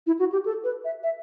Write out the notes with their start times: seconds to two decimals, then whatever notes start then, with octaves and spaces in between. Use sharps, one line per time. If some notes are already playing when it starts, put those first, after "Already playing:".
0.07 E4
0.19 F#4
0.32 G4
0.46 A4
0.64 B4
0.84 E5
1.03 E5